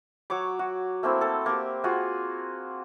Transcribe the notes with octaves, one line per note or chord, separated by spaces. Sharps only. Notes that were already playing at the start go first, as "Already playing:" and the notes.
F#3 C#5 C#6 D6
F#4
A3 A#3 C4 E4
A4
A#3 G4
F4 F#4 G#4